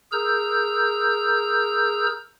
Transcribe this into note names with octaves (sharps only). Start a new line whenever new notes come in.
G#4 A#4 A#5 E6 G6